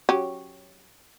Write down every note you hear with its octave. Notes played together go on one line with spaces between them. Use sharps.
F#3 C#4 G4